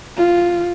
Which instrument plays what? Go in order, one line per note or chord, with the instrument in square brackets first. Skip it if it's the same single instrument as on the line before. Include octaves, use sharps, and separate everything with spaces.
[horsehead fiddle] F4